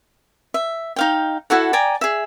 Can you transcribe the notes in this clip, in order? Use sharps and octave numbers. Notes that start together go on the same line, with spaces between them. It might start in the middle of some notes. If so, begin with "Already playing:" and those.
E5
D#4 F5 G5
E4 F#4 A4 F#5
D5 G5 G#5 A#5
G#4 E5